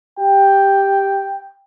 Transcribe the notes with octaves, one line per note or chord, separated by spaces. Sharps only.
G4 G5